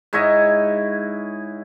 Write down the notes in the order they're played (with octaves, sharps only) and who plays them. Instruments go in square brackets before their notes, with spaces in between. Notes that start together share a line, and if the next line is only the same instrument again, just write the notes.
[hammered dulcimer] G#2 E4 C#5 D#5